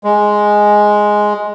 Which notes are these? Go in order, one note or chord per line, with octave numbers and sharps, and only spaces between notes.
G#3